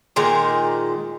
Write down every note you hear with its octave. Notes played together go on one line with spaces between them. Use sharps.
A#2 D#3 G#3 A#5